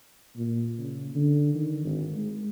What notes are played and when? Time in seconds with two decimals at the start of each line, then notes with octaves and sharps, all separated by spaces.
0.36 A#2
0.79 C#3
1.15 D3
1.55 D#3
1.84 G#1
2.14 G#3